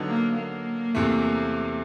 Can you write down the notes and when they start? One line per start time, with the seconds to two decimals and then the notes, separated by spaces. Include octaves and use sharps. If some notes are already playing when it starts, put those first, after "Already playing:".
Already playing: D3 F#3 B3 D#4
0.09 A#3
0.37 A#3
0.95 E2 C3 E3 A3